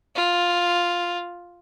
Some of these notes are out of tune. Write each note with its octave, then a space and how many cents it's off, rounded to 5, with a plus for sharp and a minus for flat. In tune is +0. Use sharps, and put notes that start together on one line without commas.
F4 +5